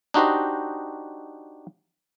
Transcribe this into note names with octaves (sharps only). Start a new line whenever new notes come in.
D4 D#4 F#4 G4 C5 D#5